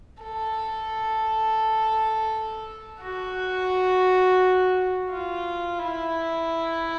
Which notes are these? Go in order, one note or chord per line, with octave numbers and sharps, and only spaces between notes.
A4
F#4
F4
E4